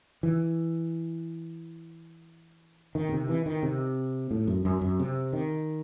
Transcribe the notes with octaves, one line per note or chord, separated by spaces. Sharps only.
E3
D#3
B2
C3
E3
D#3
C3
A2
F#2
F#2
F#2
C3
D#3